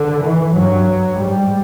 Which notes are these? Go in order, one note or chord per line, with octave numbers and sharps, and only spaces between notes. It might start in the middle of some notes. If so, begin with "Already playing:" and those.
Already playing: D3
E3
G2 F#3
G#2 G3